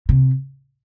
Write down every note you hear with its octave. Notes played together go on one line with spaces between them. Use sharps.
C3